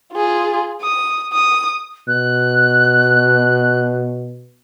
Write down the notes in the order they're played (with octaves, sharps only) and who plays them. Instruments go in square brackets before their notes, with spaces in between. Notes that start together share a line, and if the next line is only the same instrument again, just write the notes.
[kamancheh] F4 G#4
D#6
D#6
[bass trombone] B2 [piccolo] F#6